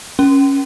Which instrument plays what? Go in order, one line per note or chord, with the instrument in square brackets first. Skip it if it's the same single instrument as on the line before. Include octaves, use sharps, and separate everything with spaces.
[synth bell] C#4